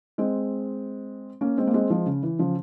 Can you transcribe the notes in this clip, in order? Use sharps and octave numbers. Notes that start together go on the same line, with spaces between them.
G#3 C4
A#3 C#4
G#3 C4
A#3
G#3 C4
F3 G#3
C#3
E3
C#3 F3